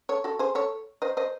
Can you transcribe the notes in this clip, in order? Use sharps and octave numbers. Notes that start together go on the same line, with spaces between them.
A4 C#5
F#4 A4
G#4 C5
A4 C#5
C5 D#5
C5 D#5